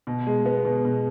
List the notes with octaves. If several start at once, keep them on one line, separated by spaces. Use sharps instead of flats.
B2
G#3
B3
B2
B2